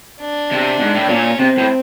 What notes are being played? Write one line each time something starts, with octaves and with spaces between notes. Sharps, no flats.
D4
C3
G#2
A2
A#2 C#4
C3 C4
A2